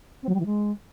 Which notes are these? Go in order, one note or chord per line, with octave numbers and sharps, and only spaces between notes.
C4
F#3
G3
E3
G#3